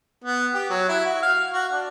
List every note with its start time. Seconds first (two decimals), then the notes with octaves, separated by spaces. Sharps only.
0.25 B3
0.54 G4
0.70 F#3
0.89 E4
1.05 F#4
1.22 F5
1.53 F#4
1.72 D4